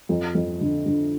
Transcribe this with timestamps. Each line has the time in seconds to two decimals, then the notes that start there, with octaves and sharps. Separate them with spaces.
0.09 F2
0.35 F2
0.61 D3
0.86 D3